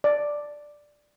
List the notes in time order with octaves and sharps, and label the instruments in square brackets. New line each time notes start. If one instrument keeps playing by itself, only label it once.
[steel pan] D5